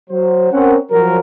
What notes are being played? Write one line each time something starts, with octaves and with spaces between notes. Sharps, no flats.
F#3 C5
C4 C#4 A#4 F#5
F3 F#3 A#4